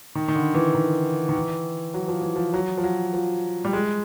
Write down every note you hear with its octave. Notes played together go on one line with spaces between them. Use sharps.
D#3
D#3
D3
E3
D#3
D#3
E3
F#3
F3
E3
F3
F#3
F3
F#3
F3
G3
G#3